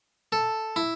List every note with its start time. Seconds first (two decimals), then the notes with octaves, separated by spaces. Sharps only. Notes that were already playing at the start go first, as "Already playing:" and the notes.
0.32 A4
0.76 E4